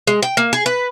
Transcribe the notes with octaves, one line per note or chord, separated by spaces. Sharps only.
G#3
G5
A#3
G#4
B4